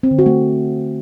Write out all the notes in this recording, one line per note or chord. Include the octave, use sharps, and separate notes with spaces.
C4
D3
F#4
A3